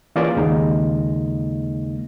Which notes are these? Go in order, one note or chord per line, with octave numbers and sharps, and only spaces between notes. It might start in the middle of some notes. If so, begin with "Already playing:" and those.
E3 A#3 C#4 F4 G#4 D5
D#2 C#3 G#3 A#3 D#4